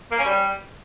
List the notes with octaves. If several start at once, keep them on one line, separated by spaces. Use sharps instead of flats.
A#3
C#4
G3